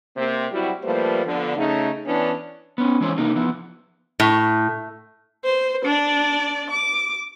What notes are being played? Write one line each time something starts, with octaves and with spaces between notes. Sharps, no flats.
C3 A#3 C4
F#3 G3 C4 E4 F#4
F3 G3 A3 A#3 B4 C5
D3 F3 B3
C#3 A3 D#4
E3 B3 C#4 D4
B3 C#4
E3 G#3 C#4 E4 C5 C#5
C3 A#3 D#4
F3 B3 E4
A2
C5
D4 D5
D6